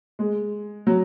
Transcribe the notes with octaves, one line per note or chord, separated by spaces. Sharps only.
G#3
F#3